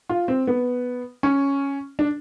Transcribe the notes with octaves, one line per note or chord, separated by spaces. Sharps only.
F4
C4
B3
C#4
D4